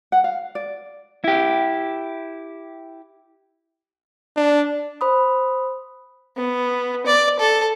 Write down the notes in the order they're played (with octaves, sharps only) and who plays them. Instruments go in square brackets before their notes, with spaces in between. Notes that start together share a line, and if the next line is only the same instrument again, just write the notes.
[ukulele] F#5
F5
D5
[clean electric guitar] E4 G4
[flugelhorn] D4
[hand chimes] C5 B5 D#6
[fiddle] B3
D5
A4